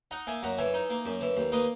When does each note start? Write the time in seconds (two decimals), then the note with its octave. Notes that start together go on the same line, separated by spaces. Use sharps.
0.11 D#4 F#5 A#5
0.27 A#3 E5 G#5
0.43 F#2 F#5 A#5
0.58 E3 E5 G#5
0.74 D#4
0.90 A#3
1.05 F#2
1.21 E3
1.37 D#2
1.52 A#3 B4 D#5